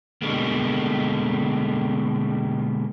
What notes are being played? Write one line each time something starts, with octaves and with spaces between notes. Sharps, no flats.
B2 D3 G3 G#3 A#3